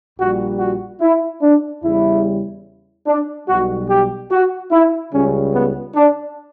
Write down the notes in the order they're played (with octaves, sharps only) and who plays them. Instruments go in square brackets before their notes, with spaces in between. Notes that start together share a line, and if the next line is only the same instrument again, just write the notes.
[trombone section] A#1 A#2 G3 F#4
F#4
E4
D4
E2 C#3 G3 E4
D4
B1 B2 G3 F#4
G4
F#4
E4
C#2 C#3 G3 C#4
B3
D4